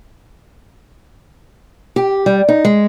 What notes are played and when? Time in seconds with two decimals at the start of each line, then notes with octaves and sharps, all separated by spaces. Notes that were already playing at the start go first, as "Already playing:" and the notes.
1.96 G4
2.26 G3
2.48 D#4
2.65 G#3